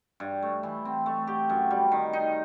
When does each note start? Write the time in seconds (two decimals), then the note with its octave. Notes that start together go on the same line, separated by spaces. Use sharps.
0.20 G2
0.43 A3
0.63 E3
0.85 C4
1.06 A3
1.27 G4
1.50 F#2
1.71 G3
1.92 D#3
2.13 D#4